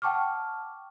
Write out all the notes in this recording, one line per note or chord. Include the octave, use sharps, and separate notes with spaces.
F#5 G5 A5 C#6 D6 F6